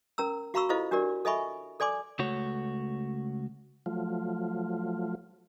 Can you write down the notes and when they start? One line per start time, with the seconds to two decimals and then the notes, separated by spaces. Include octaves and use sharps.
0.18 C#4 A#4 A#5 E6
0.54 F#4 F5 A#5 B5 C#6 E6
0.69 E4 F4 A4 C5 D#5 F5
0.91 D4 F#4 G4 A#4 D5
1.25 A4 D#5 E5 G#5 B5 C#6
1.80 A4 D5 G#5 C6 D6
2.19 C#2 A3 F#4 C#5
3.86 F3 F#3 A3 F4